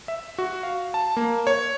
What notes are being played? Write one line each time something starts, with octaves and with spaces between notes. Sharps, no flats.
E5
F#4
F5
A5
A#3
C#5